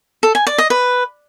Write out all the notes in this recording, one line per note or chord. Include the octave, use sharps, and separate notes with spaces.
A4
G#5
D5
D#5
B4